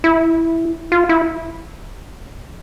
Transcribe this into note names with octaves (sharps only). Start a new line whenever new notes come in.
E4
F4
E4